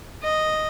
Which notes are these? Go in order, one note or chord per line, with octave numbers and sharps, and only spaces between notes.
D#5